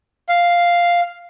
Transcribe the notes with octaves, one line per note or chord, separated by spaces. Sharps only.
F5